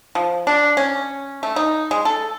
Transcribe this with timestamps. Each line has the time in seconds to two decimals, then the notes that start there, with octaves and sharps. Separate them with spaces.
0.15 F3
0.47 D4
0.77 C#4
1.43 A3
1.56 D#4
1.91 G#3
2.05 A4